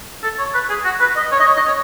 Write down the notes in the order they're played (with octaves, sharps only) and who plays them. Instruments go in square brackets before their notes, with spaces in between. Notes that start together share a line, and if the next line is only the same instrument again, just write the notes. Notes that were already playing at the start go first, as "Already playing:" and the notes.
[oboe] A4
C#5
B4
G#4
F#4
B4
D#5
C#5
D#5
C#5
D#5
C#5